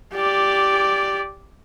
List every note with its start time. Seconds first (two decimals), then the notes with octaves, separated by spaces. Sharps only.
0.14 G4 D5